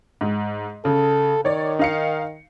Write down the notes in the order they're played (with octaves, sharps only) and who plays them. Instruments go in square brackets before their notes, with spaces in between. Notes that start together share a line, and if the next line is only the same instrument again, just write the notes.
[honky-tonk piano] G#2
[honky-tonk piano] C#3 [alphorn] A4
[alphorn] D#3 [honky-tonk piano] C#5 D5
[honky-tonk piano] D#4 F5 C#7